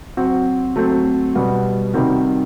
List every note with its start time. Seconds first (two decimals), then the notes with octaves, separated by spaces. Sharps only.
0.17 F#3 C4 F#4
0.76 F#3 A3 C4
1.35 B2 G3 B3 F#4
1.94 C3 D#3 G3 C4 F#4